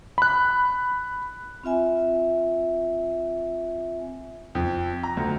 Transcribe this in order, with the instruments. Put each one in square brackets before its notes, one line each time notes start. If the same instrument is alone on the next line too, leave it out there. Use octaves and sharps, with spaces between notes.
[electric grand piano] B5 F#6
[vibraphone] C4 F4 E5 G#5
[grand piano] F2
A#5
D2